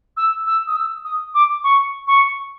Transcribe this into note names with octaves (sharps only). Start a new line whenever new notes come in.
E6
E6
D#6
E6
D#6
D6
C#6
C#6